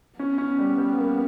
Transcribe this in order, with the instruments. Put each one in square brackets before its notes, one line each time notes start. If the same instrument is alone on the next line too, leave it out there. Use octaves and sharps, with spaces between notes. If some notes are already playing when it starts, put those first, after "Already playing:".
[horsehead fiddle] B3 [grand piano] C#4
[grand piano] C#4
G3
G3
A#3